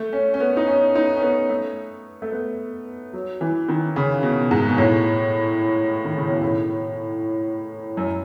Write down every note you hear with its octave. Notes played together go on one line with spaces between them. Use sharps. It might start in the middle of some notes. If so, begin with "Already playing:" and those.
Already playing: A3
C#4
C#4
B3
D#4
C#4
D#4
C#4
B3
A3
A3
B3
F#3
E3
D#3
C#3
B2
G#2
B2
A2
D#3
C#3
B2
A2
F#2